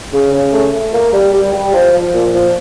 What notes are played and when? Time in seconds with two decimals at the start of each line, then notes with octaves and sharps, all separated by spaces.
0.13 C#3
0.33 C#3
0.52 A3
0.73 A3
0.93 A#3
1.13 G3
1.33 G3
1.54 G3
1.73 F3
1.94 F3
2.14 A#2
2.34 F3